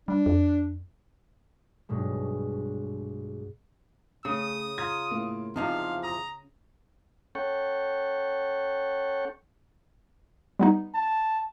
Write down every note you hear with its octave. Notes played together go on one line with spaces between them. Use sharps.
G3 D4
F2
B1 G2 B2 G#3
C#3 A3 C#4 G#4 D#6
F4 A#5 G#6
A2 A#3
E2 C3 F3 D#4 F5
A#5 D#6
C#4 A4 C#5 F#5 G5 C#6
G3 B3 D#4
A5